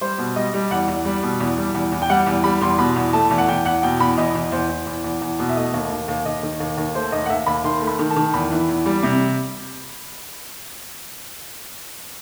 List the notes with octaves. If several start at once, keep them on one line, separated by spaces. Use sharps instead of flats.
G3 C5
B2
G3 D#5
G3
E2 F#5
E2
G3
B2
E2
G3
E2
E2
G5
G3 F#5
E2
G3 B5
E2 C6
B2 B5
E2
A3 A5
E2
F#5
E2 G5
E2 F#5
B2 G5
E2 B5
E2 D#5
E2
E2 C5
E2
E2
E2
E2
B2
E5
A3 D#5
D#2
D#2
D#2
D#2 D#5
D#3
D#2
D#2
A3 C5
D#2 D#5
F#5
D#2 E5
D#2 B5
D#3 C6
A3
B5
D#3
A5
D#3
E2 B5
E3
E2
G3
C3